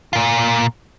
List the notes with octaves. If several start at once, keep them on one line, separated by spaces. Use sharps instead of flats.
A#2 F4